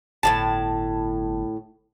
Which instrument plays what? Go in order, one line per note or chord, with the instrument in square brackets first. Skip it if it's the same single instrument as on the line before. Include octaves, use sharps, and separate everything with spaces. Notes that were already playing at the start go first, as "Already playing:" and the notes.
[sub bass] G1 [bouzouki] A2 C3 A5